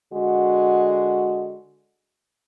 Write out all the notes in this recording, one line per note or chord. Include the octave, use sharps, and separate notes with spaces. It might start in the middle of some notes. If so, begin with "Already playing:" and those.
D3 G#3 F#4